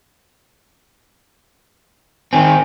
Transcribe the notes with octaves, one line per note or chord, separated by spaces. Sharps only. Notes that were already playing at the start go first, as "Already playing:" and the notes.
D#3 C4 G#5